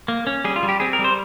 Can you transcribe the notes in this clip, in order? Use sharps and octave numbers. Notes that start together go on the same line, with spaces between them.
A#3
C#4
G3 G#4
F4
G3
G4
C4 G#4
A#4
G3
C5